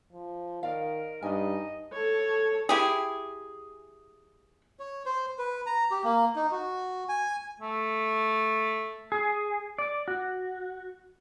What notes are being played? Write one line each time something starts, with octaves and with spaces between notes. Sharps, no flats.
F3
D#3 A#4 D5 F5
G2 D#4 D#5 G#5
A4 C#5
E4 G4 G#4
C#5
C5
B4
A#5
G4
A#3
D#4
F#4
G#5
A3
G#4
D5
F#4